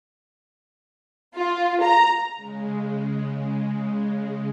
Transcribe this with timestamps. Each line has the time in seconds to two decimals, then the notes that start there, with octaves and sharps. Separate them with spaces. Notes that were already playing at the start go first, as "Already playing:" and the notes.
1.36 F4
1.82 A#5
2.36 C#3 G#3